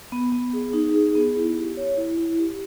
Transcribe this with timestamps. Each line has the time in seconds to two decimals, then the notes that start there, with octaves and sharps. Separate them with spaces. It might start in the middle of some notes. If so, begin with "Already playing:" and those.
0.12 B3
0.32 B3
0.53 G#4
0.73 D#4
0.94 G#4
1.15 B3
1.36 E4
1.57 G4
1.77 C#5
1.97 E4
2.18 E4
2.39 G4